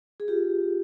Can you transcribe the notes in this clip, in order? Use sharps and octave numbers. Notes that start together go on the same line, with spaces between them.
G#4
F4 G4